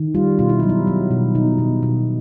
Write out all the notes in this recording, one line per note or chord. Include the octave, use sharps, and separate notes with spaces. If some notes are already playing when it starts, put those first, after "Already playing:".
Already playing: D#3
G3 F4
B2 F4
E4
F#3 D#4
E4
F#3
B2
B2 D#4
B2
B2